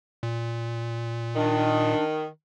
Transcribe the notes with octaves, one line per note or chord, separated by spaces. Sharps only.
A#2
D#3 D4